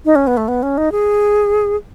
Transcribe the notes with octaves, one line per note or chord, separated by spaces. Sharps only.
D#4
C#4
B3
A3
B3
C#4
D#4
G#4